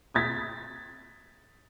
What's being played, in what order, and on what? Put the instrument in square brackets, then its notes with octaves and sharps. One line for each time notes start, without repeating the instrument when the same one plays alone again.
[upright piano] D#6 G#6 A6 B6